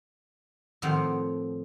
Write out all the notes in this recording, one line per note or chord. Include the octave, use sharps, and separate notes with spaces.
A2 D#3 F3 C4 F5 F#5